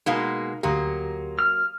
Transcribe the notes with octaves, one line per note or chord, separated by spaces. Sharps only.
B2 G#3 A#3 D#4 A#4 F5
D2 F#3 A#3 G4 A#5 C6 D#6
F6